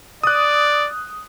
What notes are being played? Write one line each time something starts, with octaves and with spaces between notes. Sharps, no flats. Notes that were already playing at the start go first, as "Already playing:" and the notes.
D5 D#6 F#6